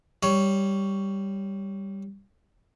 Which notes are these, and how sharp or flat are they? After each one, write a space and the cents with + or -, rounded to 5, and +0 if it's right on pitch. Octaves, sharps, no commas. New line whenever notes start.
G3 +0 C#5 +10